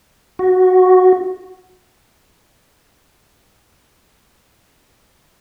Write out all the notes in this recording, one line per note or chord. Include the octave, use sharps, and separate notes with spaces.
F#4